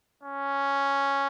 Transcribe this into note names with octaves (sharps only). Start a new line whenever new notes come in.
C#4